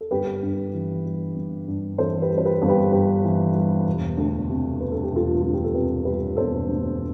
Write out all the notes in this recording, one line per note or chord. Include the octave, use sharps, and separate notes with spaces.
A4
G1 G4 B4
G2
E3
G3
G1
G2
E3 A4 C5
G4 B4
G3
C5
G4 B4
G1
G4 B4
G2 G4 B4
E3
G3
E1
D2
C3
G3 B4
A4
G4
E1 F4 A4
D2 F4
G4
A4
C3 G4 B4
G3 G4 B4
E1 A4 C5
D2